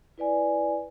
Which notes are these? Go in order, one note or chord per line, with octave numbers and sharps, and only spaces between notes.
E4 B4 D5 G#5